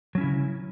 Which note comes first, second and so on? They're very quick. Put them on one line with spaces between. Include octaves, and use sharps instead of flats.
F#3 C#4 E4 C#3